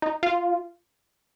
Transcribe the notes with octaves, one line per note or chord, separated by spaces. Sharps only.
D#4
F4